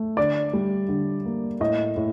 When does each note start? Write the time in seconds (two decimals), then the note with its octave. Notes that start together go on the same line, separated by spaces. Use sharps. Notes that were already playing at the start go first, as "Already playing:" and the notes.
Already playing: A3
0.17 D3 D5
0.53 G3
0.89 D3
1.25 A#3
1.60 A2 D#5
1.96 A2